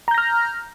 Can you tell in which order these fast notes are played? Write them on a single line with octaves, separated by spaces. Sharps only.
A#5 G6 A#6 F6